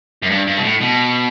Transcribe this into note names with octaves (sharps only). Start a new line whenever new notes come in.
F#2
G2
G2
B2
A2
B2